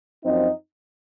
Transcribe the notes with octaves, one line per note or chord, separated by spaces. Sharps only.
F#2 F3 C4 D#4